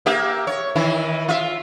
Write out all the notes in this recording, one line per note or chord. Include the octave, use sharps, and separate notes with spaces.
A#3 G4 E5
C#5
D#3 E3 E4
F4 E5